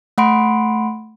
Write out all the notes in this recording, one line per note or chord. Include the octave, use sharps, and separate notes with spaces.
A3 F#5 B5 C6 D7